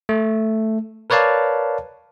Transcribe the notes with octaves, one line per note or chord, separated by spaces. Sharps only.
A3
A#4 B4 C#5 D5 F5 A5